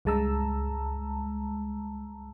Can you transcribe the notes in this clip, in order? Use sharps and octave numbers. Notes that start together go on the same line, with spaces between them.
C#2 G2 G#3 A5 A#5 E6